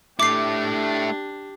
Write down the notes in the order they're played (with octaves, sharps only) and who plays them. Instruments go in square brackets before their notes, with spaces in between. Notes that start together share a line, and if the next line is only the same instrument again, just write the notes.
[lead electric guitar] A3 E4 [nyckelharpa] D4 G4 [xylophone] D6 C7